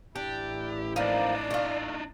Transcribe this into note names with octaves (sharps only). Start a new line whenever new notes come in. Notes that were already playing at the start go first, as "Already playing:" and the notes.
A1 D4 E4 G4
F3 A#3 D4 D#4 D5
A3 F4